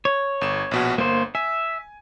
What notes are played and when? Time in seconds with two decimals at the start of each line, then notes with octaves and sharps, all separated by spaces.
0.05 C#5
0.41 G1 E7
0.71 A#1 B2 F#4
0.98 G1 A#3 C5
1.35 E5 G#5